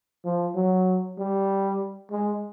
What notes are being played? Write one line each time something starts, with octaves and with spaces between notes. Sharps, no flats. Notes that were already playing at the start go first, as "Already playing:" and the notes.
F3
F#3
G3
G#3